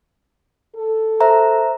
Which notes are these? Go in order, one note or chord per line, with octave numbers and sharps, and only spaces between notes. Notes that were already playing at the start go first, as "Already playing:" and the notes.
A4
C5 E5 A#5